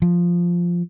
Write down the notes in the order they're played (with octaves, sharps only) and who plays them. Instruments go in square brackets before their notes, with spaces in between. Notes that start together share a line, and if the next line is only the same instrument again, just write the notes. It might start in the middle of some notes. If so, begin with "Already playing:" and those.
[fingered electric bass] F3